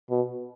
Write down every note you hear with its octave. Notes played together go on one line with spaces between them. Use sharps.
B2